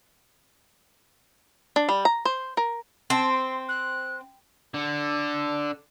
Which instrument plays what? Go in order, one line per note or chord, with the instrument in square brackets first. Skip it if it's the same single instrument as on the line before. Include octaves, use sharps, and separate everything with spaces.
[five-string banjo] D4
G3
A#5
C5
A#4
[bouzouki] C4 [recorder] A5
[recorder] C6
F#6
[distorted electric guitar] D3